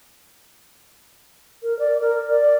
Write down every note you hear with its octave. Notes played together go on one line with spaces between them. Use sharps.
A#4
D5
A#4
D5